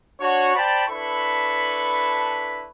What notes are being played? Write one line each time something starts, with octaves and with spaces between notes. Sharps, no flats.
D4 F#4 C#5
C5 D5 G5 A5 B5
D4 E4 A4 B4 B5 C#6